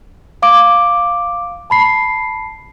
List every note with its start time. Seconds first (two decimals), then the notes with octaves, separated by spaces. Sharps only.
0.42 F5 D6 D7
1.70 A5 B5 C7